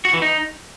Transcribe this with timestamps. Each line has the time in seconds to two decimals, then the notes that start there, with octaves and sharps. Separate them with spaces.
0.05 F#4
0.13 E3
0.22 D#4